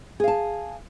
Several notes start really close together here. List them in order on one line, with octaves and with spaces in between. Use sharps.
G#4 F5 A5